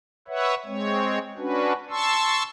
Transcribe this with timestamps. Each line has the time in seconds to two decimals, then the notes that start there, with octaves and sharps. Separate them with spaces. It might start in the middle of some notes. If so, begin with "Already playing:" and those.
0.28 B4 C#5 E5 F#5
0.66 G#3 C4 C#5
1.38 C#4 D4 F#4 B4
1.90 A5 C6 C#6 E6